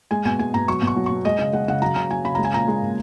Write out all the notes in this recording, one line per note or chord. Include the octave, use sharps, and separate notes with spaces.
G#3 G#5
B2 G#5
G#3 G#5
B2 A#5
F#3 C#6
B2
C#6
F#3
B2 C#6
G#3 D#5
C#3 D#5
G#3 F#5
C#3 F#5
F#3 A#5
C#3 A#5
F#3 G#5
C#3 B5
G#3 A#5
G#5
A#2 A#5
G#3
A#2